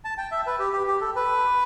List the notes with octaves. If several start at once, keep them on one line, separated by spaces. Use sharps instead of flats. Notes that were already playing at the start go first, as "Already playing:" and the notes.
A5
G5
E5
B4
G4
G4
G4
A4
B4